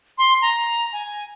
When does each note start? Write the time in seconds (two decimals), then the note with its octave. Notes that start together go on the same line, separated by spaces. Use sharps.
0.18 C6
0.42 A#5
0.93 G#5